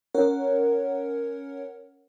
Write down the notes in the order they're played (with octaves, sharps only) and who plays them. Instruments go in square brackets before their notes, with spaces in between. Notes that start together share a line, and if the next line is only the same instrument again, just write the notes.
[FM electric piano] C#4 A#4 C#5 F#5